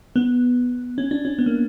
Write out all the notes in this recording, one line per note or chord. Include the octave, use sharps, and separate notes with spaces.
B3
C#4
D4
C#4
B3
A#3